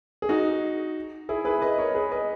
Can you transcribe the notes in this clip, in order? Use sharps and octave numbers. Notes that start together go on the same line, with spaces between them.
G#4
D#4 F#4
E4 G#4
G#4 B4
B4 D#5
A#4 C#5
G#4 B4
B4 D#5